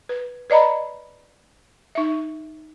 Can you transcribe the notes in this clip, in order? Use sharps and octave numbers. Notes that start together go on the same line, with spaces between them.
B4
B4 D5 D#5 A#5 B5
D#4 E5